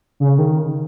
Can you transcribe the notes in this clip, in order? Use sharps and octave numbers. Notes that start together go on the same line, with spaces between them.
C#3
D#3